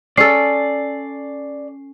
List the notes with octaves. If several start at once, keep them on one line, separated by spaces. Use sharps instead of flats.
C#4 A4 D5 C7